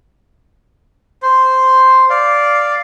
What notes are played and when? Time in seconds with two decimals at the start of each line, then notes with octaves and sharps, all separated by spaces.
1.22 C5
2.10 D5 F5